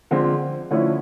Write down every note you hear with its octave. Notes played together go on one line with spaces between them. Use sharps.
D3 F3 G#3 C4
D3 F3 A3 C#4 E4